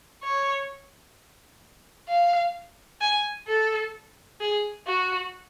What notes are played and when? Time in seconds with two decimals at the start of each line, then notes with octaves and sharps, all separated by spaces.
0.23 C#5
2.09 F5
3.01 G#5
3.47 A4
4.40 G#4
4.87 F#4